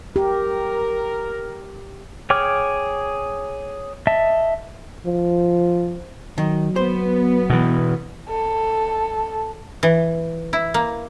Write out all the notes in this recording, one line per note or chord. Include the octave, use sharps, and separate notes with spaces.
G4 A#4
G#4 C#5 G5 D6 F6
D#5 E5 A5
F3
D#3 F#3
B3 C5
B2 E3
A4
E3
E4
A#3